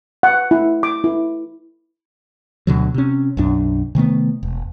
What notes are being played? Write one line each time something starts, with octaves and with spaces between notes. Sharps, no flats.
F#5
E4
D6
E4
D2 B2 D3 F#3
C3 C#4
B1 F#2 D4
C3 D#3 A3 B3
E1